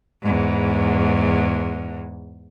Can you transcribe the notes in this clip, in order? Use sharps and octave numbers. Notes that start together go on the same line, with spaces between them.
E2 G#2